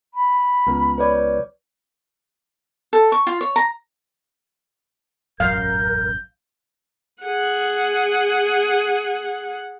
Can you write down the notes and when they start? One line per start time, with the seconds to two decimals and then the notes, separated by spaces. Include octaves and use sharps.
0.14 B5
0.67 C#2 B3 A#4
0.98 B4 C#5 D5
2.93 A4
3.12 C#6
3.27 F4
3.41 C#5
3.56 A#5
5.40 E1 A1 F#2 A#4 F5 G6
7.23 G#4 F#5